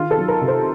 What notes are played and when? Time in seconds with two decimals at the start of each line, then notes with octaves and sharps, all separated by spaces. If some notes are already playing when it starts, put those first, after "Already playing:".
Already playing: D#3 F4
0.11 A4
0.18 F#3
0.28 A#4
0.41 C3
0.48 C5